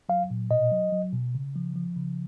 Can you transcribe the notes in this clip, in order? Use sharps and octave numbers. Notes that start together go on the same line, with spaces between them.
F#3 F5
A#2
B2 D#5
F#3
F#3
B2
C#3
F3
F3
C#3